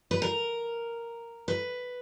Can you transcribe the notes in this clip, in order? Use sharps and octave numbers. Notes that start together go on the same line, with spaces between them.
B4
A#4
B4